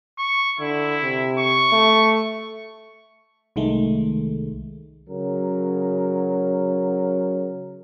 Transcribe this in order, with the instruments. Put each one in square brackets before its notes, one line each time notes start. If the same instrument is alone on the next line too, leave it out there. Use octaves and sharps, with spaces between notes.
[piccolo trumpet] C#6
[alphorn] D3 [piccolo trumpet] E4
[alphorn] C3
[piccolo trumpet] C#6
[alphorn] A3
[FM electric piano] C2 D#3 G#3 A3
[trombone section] C#3 F#3 A#4